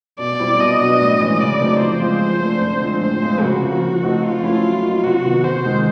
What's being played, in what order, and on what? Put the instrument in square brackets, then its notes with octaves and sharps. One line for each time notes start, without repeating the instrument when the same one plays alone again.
[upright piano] B2 [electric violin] D5
[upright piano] G3 C4 E4
[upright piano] B2 [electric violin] D#5
[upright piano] F#3 B3 D4 F#4
A2
E3 G#3 C#4
[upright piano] C#3 [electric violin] D5
[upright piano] F#3 A3 C4 D#4
[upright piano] F3 [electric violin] C5
[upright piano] G#3 C4 F4
F3
A3 D4
D3
F3 G#3 C4
[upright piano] A2 [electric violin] C5
[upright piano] F3 G#3 C4 F4
[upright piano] C#3 [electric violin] F#4
[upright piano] F3 A#3
F3
A3 C4 D#4
[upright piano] F3 [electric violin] F4
[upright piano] A3 C#4 E4
F#3
A#3 D#4 F#4
[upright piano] C3 [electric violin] F#4
[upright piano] D#3 F#3 B3
[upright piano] C3 [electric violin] C5
[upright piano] D#3 G#3 C4